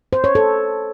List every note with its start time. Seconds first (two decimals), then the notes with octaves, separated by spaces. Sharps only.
0.13 C5
0.24 C#5
0.35 A4